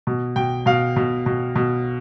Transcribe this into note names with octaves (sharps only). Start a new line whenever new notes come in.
B2
B2 G5
B2 F5
B2
B2
B2